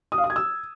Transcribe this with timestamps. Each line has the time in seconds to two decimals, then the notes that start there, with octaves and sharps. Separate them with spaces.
0.12 D#6
0.18 F5
0.24 D#6
0.30 G#6
0.36 E6